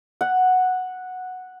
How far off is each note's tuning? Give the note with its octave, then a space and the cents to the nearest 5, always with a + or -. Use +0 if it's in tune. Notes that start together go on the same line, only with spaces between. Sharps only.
F#5 -5